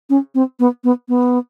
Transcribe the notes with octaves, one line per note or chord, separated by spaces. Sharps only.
C#4
C4
B3
B3
B3